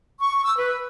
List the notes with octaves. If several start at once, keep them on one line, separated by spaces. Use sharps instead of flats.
C#6
E6
B4